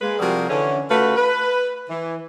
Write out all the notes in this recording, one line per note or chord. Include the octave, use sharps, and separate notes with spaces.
G#3 A#3 B4
C3 F3 G3 F#4 G#4 A#4
D3 E3 C#4
C#3 A3 F4 F#4 B4
B4
E3